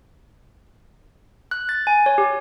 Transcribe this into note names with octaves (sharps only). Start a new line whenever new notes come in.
F#6
A6
G#5
C#5
G4